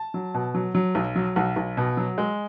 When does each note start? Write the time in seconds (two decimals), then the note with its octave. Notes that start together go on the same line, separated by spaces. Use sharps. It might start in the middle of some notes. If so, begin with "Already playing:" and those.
Already playing: A5
0.14 F#3
0.34 B2
0.55 F#3
0.75 F#3
0.95 B1
1.16 F#3
1.36 B1 F#5
1.56 B1
1.77 B2
1.97 F#3
2.18 G#3